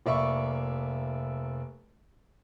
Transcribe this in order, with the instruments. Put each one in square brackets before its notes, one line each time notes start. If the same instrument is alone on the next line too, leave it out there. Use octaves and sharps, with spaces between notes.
[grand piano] F1 A#3 D5 E5 B5 C#6